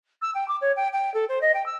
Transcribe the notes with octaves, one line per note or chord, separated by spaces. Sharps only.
E6
G5
D6
C#5
G5
G5
A4
C5
D#5
G5
E6